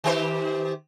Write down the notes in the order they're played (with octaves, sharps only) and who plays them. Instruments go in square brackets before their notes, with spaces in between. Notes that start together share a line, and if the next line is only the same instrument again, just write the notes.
[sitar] D#3 G4 C5